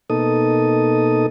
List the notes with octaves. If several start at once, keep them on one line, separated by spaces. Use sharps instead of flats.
B2 A#3 D#4 A4 D#6